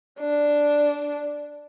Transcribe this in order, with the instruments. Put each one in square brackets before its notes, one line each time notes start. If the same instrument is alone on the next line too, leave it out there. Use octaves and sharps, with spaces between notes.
[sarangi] D4